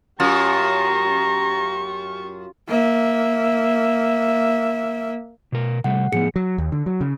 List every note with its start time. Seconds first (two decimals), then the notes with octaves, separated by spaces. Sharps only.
0.20 F#2 F4 G4 A#5 C#6
2.68 A#3 E5
5.52 B2 A#4
5.84 C3 G3 A3 F#5
6.12 A2 F3 B3 G#4 C#7
6.36 F#3
6.58 D#2
6.72 D3
6.86 F#3
7.01 C#3